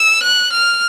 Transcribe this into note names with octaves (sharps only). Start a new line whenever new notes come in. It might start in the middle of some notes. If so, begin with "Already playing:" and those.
Already playing: E6
F#6
F6